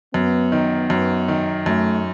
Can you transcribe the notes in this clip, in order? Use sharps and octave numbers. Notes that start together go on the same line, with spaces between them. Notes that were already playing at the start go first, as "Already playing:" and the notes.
F#2 B3
D#3
F#2
D#3
F#2 A3